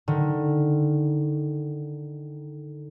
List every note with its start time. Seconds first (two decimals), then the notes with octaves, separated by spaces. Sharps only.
0.08 D3 D#3